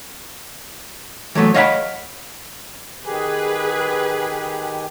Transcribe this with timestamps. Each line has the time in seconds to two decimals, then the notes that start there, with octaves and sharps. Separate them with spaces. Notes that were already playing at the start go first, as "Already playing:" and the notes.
1.35 E3 F#3 A3 B3
1.54 C#5 D#5 F5 F#5 G#5 B5
3.06 D#3 G4 G#4 B4 G#5